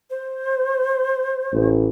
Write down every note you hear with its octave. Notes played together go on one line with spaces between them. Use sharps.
C5
A1